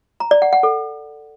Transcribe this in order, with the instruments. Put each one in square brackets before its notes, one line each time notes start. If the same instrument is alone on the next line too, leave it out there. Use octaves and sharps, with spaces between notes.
[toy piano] A#5
D5
F#5
F#5
A4